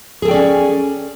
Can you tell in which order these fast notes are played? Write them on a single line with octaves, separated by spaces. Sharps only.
G#4 A4 G5 D5 C#4